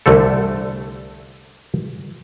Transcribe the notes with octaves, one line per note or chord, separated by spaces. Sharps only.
C2 D3 A3 A4